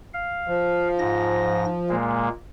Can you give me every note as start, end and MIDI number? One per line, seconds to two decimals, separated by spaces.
0.14 0.88 77
0.47 1.95 53
0.99 1.65 44
0.99 1.65 94
1.89 2.29 46
1.89 2.29 56
1.89 2.29 58